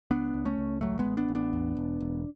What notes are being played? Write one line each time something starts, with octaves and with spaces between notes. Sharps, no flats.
C#2 B3 D4
C#2
A3 C#4
C#2
A1 F#3 A3
G#3 B3
A1
B3 D4
A1
B3 D4
E2
E1
E1